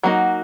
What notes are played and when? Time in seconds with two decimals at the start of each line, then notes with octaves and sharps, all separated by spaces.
0.03 F#3 A#3 D#4 F#4